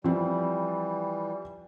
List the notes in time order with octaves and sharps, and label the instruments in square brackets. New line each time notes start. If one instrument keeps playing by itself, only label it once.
[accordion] E3 G3 [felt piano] F3 C4